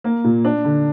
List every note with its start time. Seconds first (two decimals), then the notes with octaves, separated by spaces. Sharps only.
0.04 A#3
0.24 A#2
0.45 D4
0.64 D3